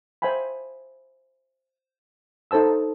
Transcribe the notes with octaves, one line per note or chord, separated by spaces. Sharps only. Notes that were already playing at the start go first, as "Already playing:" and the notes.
C5 E5 G5 G#5 B5
D#4 A4 C5 A5 E6